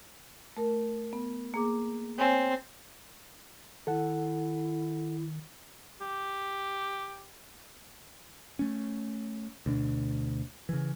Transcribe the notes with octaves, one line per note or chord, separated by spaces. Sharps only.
A3 A#4
B3
A#3 G#4 D6
C4 C#5 G#5
D#3 E4 A4 F#5
G4
A3 C#4
D2 B2 D4
C#3 E3